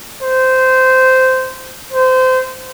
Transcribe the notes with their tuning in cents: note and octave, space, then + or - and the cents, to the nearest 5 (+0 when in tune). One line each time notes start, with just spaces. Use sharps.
C5 -15
C5 -25